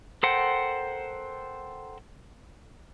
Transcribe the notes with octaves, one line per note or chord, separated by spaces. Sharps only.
A4 A#4 C5 F#5 G5